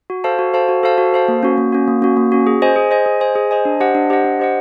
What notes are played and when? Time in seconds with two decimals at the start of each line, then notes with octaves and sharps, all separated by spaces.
0.10 F#4
0.24 A4 C5 F5 A5
0.39 F#4
0.54 A4 C5 F5 A5
0.69 F#4
0.83 A4 C5 F5 A5
0.98 F#4
1.13 A4 C5 F5 A5
1.28 A#3
1.43 C#4 F#4
1.58 A#3
1.72 C#4 F#4
1.88 A#3
2.02 C#4 F#4
2.17 A#3
2.32 C#4 F#4
2.47 G#4
2.62 C5 D#5 G#5
2.76 G#4
2.91 C5 D#5 G#5
3.06 G#4
3.20 C5 D#5 G#5
3.35 G#4
3.51 C5 D#5 G#5
3.65 D4
3.80 G4 C5 D#5 F#5
3.95 D4
4.10 G4 C5 D#5 F#5
4.24 D4
4.39 G4 C5 D#5 F#5